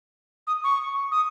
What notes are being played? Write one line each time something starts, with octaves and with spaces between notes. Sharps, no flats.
D#6
C#6
D#6